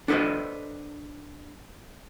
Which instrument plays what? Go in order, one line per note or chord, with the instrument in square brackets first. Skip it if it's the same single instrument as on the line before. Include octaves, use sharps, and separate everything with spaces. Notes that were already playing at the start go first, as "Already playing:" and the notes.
[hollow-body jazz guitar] D4 A4 B4 C5 D#5